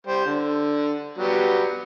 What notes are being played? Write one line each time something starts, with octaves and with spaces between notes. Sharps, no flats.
G3 C5
D3
F#3 G3 B3